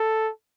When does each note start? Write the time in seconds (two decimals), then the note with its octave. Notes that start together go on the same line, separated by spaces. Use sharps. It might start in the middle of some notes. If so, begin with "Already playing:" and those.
Already playing: A4